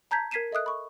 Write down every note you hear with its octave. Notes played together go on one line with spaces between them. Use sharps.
A5 A#5 G6 G#6 B6
A#4 G#6 B6 C7 D#7 E7
A4 D#5 E5 D#6 F#6
B5 C#6